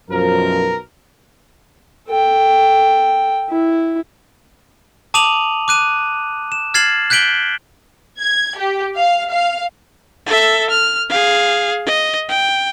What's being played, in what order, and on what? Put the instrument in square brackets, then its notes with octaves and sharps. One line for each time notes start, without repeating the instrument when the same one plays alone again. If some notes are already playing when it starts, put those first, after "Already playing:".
[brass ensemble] B1 A#4 [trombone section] F#2 F3
[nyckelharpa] A4 G5
E4
[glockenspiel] A5 D6 D#6 D#7 F7 F#7
D6 F#6 D#7
E7
F6 G#6 A6 C7 E7 F#7
F#6 G6 B6 D7 F#7 G7
[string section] G#6
G4
F5
F5
[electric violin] A4 E5
F6
G#4 F5
D#5
G5